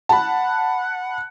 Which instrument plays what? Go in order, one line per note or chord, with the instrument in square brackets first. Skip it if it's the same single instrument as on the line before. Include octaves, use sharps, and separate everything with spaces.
[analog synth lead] F#5 [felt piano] A5 B5